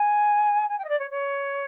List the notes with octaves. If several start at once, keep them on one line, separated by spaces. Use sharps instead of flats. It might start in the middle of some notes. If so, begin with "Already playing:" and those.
Already playing: G#5
G#5
G5
D#5
D5
C#5
C#5